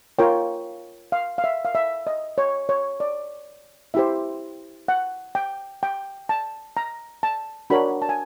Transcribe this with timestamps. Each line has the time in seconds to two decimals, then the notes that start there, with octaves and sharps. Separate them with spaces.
0.18 F4 A#4 C#5 G5
1.12 F5
1.38 F5
1.44 E5
1.65 F5
1.75 E5
2.07 D#5
2.38 C#5
2.69 C#5
3.00 D5
3.94 E4 G4 C5 E5
4.88 F#5
5.35 G5
5.83 G5
6.29 A5
6.77 A#5
7.23 A5
7.70 D4 F#4 A#4 C#5 B5
8.02 A5
8.09 G#5